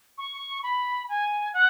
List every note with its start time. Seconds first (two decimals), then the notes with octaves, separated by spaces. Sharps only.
0.18 C#6
0.63 B5
1.09 G#5
1.54 F#5